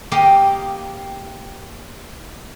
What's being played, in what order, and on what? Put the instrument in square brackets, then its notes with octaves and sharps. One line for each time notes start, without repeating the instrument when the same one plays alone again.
[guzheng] A#3 G4 D#5